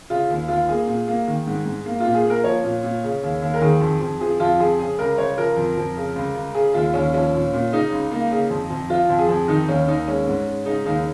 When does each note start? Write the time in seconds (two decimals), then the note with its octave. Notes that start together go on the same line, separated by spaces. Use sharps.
0.10 C#3 F4
0.30 D#2
0.48 D#2 F4
0.69 A#3 G#4
0.87 A#2
1.08 A#3
1.28 D#3
1.47 G#2
1.66 G#2
1.86 A#3
2.00 F4
2.05 A#2
2.15 G#4
2.25 A#3
2.30 A#4
2.44 F3 C#5
2.63 A#2
2.83 A#2
3.04 C#3
3.23 D#2
3.42 D#2
3.54 A#4
3.61 D#3 G#4
3.81 F2
4.01 F2
4.20 F3 G#4
4.40 F2 F4
4.60 F2 G#4
4.79 C#3 G#4
4.98 C#2 A#4
5.18 C#2 C#5
5.38 F3 A#4
5.57 F2
5.77 F2
5.96 C#3
6.16 C#2
6.35 C#2
6.54 C#3 G#4
6.74 D#2 F4
6.94 D#2 C#4
7.14 F3 C#4
7.33 A#2
7.53 A#2
7.72 C#3 D#4
7.92 C#2
8.11 A#3
8.31 C#3
8.50 F2
8.70 F2
8.90 F3 F4
9.10 F2
9.19 G#4
9.29 F2
9.48 D#3 D#4
9.68 D#2 C#4
9.88 D#2 D#4
10.07 G#3 C#4
10.27 G#2
10.47 G#3
10.66 C#3 D#4
10.85 D#2 D#4